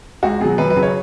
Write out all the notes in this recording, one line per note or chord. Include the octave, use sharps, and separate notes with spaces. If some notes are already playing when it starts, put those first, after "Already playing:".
C#2 F#4
B2 F#3 G#4
F#2 B4
B4
C#3 F#3
C#5